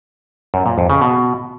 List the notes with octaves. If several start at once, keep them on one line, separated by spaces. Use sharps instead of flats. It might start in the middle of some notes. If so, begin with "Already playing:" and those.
F#2
A#2
F2
C#3
B2